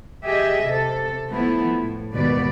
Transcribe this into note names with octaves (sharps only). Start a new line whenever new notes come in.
G4 G#4 D#5 E5
C3 A4
F3 A3 B3 E4
A2
D#2 G#2 B2 B3 B4 D5